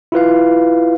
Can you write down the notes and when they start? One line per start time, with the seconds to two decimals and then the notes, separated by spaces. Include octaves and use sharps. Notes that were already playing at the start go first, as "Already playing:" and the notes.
0.12 E4 F4 B4 F5